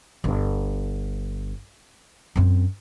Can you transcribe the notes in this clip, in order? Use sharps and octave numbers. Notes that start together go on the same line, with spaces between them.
G1 D4
F#2 C4